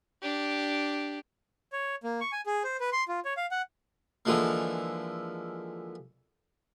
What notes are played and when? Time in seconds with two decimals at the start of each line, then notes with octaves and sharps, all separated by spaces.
0.22 D4 G4
1.73 C#5
2.03 A#3
2.21 C#6
2.32 G#5
2.46 G#4
2.64 C5
2.80 B4
2.92 C6
3.08 F4
3.25 C#5
3.37 F5
3.51 F#5
4.25 D3 E3 F3 G#3 A#3